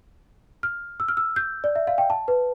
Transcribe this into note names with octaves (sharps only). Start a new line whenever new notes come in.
F6
E6
F6
E6
G6
D5
E5
F5
G5
A5
B4